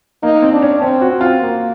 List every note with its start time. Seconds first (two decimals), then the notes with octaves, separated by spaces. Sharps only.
0.22 A#3 D#4
0.42 C4
0.52 D4
0.62 C#4
0.82 C4 C#4
1.02 F#4
1.10 C4
1.21 F4
1.41 A#3